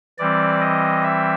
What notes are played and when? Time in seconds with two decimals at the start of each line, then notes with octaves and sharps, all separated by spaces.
0.18 E3 G3 C4 D5
0.61 D#5
1.03 E5